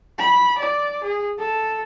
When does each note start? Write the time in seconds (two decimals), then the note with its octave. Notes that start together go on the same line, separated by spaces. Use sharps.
0.19 B5
0.58 D5
1.04 G#4
1.39 A4